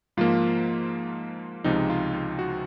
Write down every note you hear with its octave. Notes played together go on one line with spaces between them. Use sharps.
G#2 F3 A#3 F4
C#2 C3 F3 G#3 D#4
F4
F4
F#4